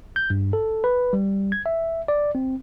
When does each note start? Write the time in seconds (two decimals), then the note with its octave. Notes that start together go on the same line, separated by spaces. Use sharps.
0.16 G6
0.30 G2
0.53 A4
0.84 B4
1.13 G3
1.52 G#6
1.66 E5
2.08 D5
2.35 C4